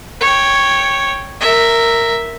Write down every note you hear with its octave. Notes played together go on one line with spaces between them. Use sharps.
C#5 G5
A#4 E5